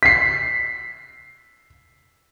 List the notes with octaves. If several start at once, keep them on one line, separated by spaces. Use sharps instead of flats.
B6 C7